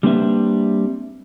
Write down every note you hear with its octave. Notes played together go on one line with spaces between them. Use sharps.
G3 A#3 C4 D4 B4 E5